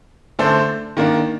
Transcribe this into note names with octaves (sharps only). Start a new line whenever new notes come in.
D3 A3 D4 A4 C5
D#3 A#3 D4